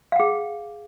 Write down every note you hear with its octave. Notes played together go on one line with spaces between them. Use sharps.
G#4 F5 F#5